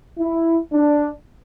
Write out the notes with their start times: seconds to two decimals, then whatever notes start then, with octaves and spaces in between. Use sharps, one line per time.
0.19 E4
0.73 D4